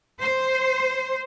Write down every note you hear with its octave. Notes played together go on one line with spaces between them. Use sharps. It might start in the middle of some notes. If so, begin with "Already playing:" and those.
C5